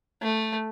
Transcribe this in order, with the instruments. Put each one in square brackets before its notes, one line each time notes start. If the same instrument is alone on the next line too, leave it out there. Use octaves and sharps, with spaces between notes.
[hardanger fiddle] A3